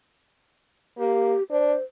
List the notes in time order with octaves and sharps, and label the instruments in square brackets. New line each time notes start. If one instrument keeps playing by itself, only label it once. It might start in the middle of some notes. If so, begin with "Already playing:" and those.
[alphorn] A#3 [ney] G4
[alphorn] D4 [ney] C5